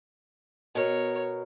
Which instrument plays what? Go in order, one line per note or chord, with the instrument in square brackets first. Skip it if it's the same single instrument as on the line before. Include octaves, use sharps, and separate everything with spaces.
[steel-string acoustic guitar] B2 A#4 [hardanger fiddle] C#5